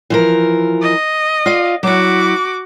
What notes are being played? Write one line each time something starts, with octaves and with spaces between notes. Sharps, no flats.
E3 F3 A#4
D#5
F4 D5 F5
F#3 E4 F#4 D6